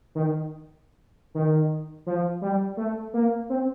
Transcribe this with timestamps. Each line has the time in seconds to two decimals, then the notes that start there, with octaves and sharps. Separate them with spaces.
0.15 D#3
1.35 D#3
2.07 F3
2.42 G3
2.77 A3
3.14 A#3
3.50 C4